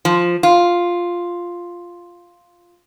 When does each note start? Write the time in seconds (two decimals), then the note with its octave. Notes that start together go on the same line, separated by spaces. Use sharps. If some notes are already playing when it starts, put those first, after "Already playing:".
0.05 F3
0.43 F4